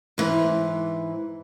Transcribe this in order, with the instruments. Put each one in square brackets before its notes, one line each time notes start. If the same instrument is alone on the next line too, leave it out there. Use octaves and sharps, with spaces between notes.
[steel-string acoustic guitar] G#2 E3